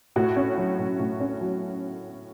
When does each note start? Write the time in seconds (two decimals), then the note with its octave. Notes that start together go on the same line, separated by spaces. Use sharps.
0.16 A2 F#4
0.36 C#4
0.58 F#3
0.79 A2
0.99 A2
1.20 C#4
1.41 F#3